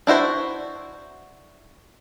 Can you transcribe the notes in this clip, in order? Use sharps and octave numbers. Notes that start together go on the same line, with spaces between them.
D4 E4 F#4 C5